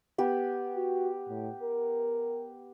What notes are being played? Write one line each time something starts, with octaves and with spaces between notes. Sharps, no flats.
B3 G4
F#4
A2
A#4